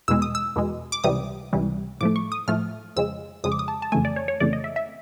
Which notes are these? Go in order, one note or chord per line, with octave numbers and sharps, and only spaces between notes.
E2 B2 G#3 E6
D#6
E6
E2 B2 G#3
D6
C#2 C3 E3 G3 D#6
C#2 C3 E3 G3
A2 F3 A3 D6
C#6
D#6
A2 F3 A3 F6
F2 C#3 F3 G#3 E6
F2 C#3 F3 G#3 D#6
D6
D#6
A5
A5
F2 C#3 E3 A3 G#5
D5
C#5
C#5
F2 C#3 E3 A3 D5
D#5
E5
E5